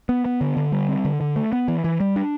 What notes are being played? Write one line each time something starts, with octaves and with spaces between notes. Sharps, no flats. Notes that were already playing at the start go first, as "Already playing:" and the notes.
B3
B3
D3
D3
G3
C4
D3
D3
A3
B3
E3
E3
G3
D4